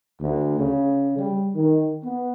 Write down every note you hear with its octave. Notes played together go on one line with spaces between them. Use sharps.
D2
C#3
G3
D#3
B3